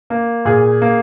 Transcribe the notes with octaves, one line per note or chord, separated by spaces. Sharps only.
A#3
A#2 G#4
A#3